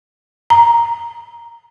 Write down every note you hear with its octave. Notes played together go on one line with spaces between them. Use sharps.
A#5